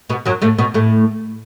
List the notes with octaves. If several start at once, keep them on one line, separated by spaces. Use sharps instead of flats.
B2 B3
F#2 F#3
A2 A3
B2 B3
A2 A3